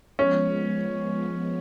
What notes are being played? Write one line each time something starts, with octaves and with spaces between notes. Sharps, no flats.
F3 G#3 B3 C#4